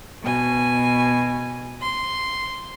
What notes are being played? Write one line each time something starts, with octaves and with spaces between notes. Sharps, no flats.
B2 G#5
C6